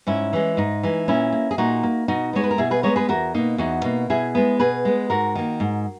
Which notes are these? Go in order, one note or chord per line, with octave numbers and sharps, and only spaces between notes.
G#2 C#4 E4
E3 G#3
G#2 D#4
E3 G#3
A#2 C#4 E4
A#3
G#4
A#2 D#4 F#4
A#3
B2 D#4 F#4
G#3 B3 C#5
B4
A#4
B2 E4 G#4
G#4 B4
G#3 B3 A#4 C#5
G#4 B4
E2 F#4 A#4
B2 A#3 D#4
E2 D#4 F#4
B2 A#3
B2 E4 G#4
G#3 B3
B2 G#4 B4
G#3 B3
G#2 F#4 A#4
D#3 A#3
G#2